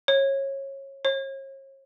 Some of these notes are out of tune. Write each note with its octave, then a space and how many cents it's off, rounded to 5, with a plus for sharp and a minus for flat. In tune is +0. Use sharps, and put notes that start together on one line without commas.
C#5 -25
C#5 -40